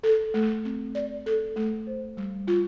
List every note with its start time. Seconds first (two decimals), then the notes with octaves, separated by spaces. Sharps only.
0.03 A4
0.34 A3
0.65 C4
0.95 D5
1.26 A4
1.56 A3
1.87 C5
2.17 G3
2.47 F4